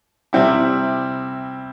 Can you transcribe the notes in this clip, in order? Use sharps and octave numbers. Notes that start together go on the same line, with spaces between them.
C3 G3 C4 E4